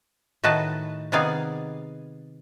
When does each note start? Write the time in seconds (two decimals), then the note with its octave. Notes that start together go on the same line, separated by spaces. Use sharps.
0.44 A2 D#3 F#4 B4 D#5 A5
1.12 C3 D#3 B3 G#4 D5 F5